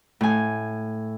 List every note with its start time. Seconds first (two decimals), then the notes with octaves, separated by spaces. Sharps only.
0.21 A2 G#5